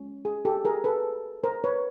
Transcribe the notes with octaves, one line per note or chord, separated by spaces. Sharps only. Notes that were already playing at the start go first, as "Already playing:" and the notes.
Already playing: G#3 C#4 F4
G#4
G4 A4
G#4 A#4
A4 B4
A#4 C5
B4 C#5